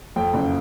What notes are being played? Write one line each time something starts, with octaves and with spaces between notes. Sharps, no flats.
F2 G5
F#1